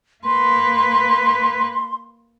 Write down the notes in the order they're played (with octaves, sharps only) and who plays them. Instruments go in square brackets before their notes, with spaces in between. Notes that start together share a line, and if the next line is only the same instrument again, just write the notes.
[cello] A#3 B4 [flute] C6